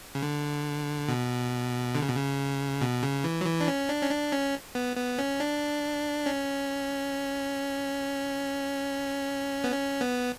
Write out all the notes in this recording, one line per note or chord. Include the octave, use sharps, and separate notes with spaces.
C#3
D3
B2
D3
C#3
B2
C#3
B2
C#3
E3
F#3
E3
D4
C#4
D4
C#4
D4
C#4
B3
B3
C#4
D4
C#4
B3
C#4
B3